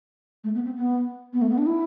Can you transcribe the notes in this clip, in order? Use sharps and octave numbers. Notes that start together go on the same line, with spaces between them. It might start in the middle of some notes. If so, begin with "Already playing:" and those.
A3
B3
C4
B3
B3
A3
B3
D4
E4